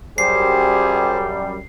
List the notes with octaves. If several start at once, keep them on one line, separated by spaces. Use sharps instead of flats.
F#2 G3 G4 G#4 C5 C7